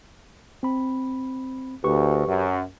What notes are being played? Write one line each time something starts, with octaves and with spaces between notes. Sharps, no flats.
C4 B5
D2 G4 B4 C#6
F#2